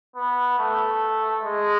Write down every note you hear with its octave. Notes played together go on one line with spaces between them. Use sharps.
B3
A3
G#3